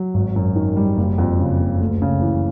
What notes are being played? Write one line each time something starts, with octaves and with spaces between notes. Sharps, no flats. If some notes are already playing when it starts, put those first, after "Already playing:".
Already playing: F#3
G#1
F#2
D#3
G3
F#1
F2
C#3
F#1
D2
C#3
E3